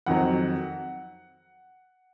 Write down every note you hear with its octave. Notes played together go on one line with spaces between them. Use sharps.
F2 D#3 F#3 F#5